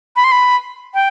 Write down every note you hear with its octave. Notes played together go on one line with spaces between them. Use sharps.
B5
C6
B5
G5